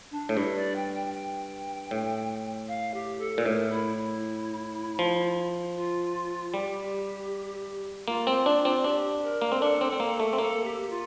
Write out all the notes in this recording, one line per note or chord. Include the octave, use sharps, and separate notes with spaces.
D4
A2
G2 E4
D5
G5
G5
G5
A2
F5
G4
A4
A#2
A2 A#4
E4
E4
F3
F4
G3 G4
A#3 F4
C4
D4
C4
D4 G4
A#4
A#3
C4
D4 A4
C4
C4
A#3
A3
C4
A#3 A4
G4
G4
F4